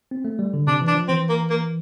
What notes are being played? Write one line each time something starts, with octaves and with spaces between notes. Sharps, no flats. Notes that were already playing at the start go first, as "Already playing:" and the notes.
C4
A3
G3
D3
C3 D4
E3
D4
F3
E3 C4
A#3
A#3